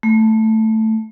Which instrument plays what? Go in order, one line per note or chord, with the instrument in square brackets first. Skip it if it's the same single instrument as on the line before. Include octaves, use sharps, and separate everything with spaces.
[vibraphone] A3